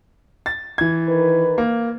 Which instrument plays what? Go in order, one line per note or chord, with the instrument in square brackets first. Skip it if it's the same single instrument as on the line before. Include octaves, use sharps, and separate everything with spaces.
[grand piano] A6
E3 G#6
[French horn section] D#3 A#4 B4
[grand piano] A#3